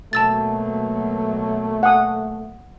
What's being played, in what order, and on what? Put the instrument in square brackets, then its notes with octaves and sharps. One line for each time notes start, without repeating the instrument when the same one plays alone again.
[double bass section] B2 F#3 A#3 [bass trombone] A3 [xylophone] A5 E6 A6
[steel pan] F#5 G#5 D#6